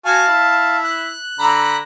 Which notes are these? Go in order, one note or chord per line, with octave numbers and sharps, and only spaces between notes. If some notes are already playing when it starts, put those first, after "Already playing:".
F#4 F5 G#5 A5
E4
F#6
D3 A#5 B5